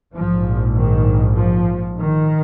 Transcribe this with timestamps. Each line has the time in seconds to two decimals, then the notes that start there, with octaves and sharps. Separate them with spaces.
0.15 A#1 G#2 F3
0.76 D#3
1.37 F3
1.99 D#3